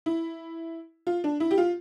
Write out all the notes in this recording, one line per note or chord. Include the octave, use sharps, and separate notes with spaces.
E4
F4
D4
E4
G4
F4